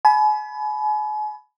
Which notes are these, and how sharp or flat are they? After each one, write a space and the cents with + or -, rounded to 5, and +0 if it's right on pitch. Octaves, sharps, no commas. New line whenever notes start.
G#5 +40 B5 +0